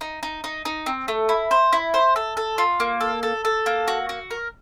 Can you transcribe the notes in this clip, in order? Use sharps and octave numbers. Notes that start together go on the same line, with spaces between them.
D#4
D#4
D#4
D#4
C4
A3
E4
C5
E4
C5
A4
A4
F4
A#3
A4
A4
A4
A#3
F#4
F#4
A#4